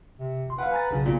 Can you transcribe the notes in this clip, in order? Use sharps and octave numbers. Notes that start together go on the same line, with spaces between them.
C3
G1 C6
B4 F5 F#5
G#5 A#5 A6
B1 C#3 D4 F#4
A#2